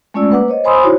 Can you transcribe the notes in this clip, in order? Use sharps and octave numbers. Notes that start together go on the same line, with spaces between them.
G#3 A3 C#4 F4 D5 E6
A#3 B4 F#5 D6
C5 C#5 D#5
C5 G#5 B5 C6 D#6 E6
D#4 E4 F#4 C5 C#5